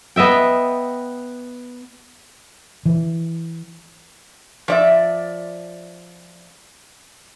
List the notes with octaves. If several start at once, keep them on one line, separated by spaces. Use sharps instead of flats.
B3 D#5 E5 G5
E3
F3 D5 E5